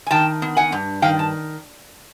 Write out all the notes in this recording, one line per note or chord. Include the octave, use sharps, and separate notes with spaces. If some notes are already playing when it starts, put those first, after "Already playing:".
G#5
D#3 G5 A5
B3
F#5 G#5
G2
D#3 F5 G5
A5